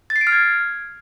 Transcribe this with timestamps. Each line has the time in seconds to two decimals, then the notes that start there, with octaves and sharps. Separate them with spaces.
0.10 A6
0.16 C7
0.21 D7
0.27 F6
0.32 G#6